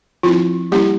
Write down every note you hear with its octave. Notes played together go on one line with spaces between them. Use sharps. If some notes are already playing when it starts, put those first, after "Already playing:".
F3 C4 E4 F4
G3 A#3 C#4 E4 G4